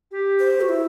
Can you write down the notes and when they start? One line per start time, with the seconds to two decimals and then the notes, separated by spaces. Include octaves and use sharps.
0.11 G4
0.40 C5
0.61 F#4
0.69 E4